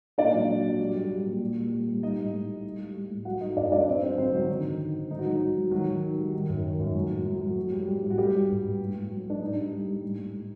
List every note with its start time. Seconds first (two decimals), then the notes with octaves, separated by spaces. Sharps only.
0.18 A#2 D4 D5
0.33 F#3
0.49 F#3
0.64 F#3
0.79 G3
0.95 G3
1.11 G3
1.25 A#2
1.42 G3
1.56 A#2
1.72 G3
1.87 G3
2.02 G3 D#4 D#5
2.18 A2
2.34 A2
2.49 G3
2.64 A2
2.79 G3
2.95 G3
3.10 A2
3.25 F#3 F#4 F#5
3.41 F#3 D#4 D#5
3.56 F#2 D4 D5
3.72 F#3 D4 D5
3.87 F#3 C4 C5
4.03 F#3 C4 C5
4.18 D3 C4 C5
4.33 D3 F#3 F#4
4.49 D#3 D#4
4.64 D#3
4.79 D#3
4.94 D#3
5.10 A2 D#4
5.19 F#4
5.26 F#3 D#4
5.42 F#3
5.57 F#3
5.71 D#3 F#3 F#4
5.87 D#3
6.02 D#3
6.17 G3
6.34 D#3
6.49 F#2
6.64 D#3
6.79 F#2
6.94 F#3
7.10 A2
7.26 F#3
7.41 F#3
7.57 A2
7.72 G3
7.88 G3
8.03 A2
8.10 F#4
8.18 G3 G4
8.33 G3
8.48 G2
8.64 G2
8.80 A2
8.95 A2
9.11 F#3
9.25 F#3 D4
9.41 A2 D#4
9.57 G3
9.72 G3
9.87 G3
10.03 A2
10.18 A2
10.33 A2